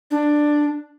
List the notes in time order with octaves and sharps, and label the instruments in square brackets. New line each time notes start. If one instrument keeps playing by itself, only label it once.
[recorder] D4